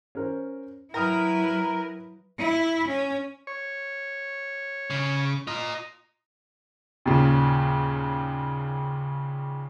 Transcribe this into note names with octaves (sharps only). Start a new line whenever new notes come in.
C#4 A#4 C5
F#3 E4 A#4 B4 G5 A#5 D#6
E4
C#4
C#5
C#3
F4 D#5 A#5
D#2 A#2 C#3